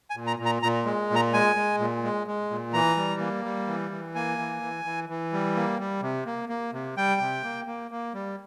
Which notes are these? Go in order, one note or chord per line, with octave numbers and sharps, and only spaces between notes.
G#5
A#2
A#5
A#2
A#5
A#2 A#5
G#3
A#2
A#5
G#3 G#5
G#3
A#2
G#3
G#3
A#2
E3 A#5
G3
A#3
G3
E3
E3
A#3 G#5
E3
E3
E3
E3
G3
A#3
G3
C3
A#3
A#3
C3
G3 G5
C3
A#3
A#3
A#3
G3